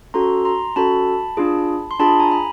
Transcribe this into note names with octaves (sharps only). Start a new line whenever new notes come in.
C#4 F#4 A4 A#5 C6
A#5 C6
C#4 F#4 A4 A5 B5
D4 F4 G#4
C6
D4 F4 G#4 A5 B5
G#5 A#5
B5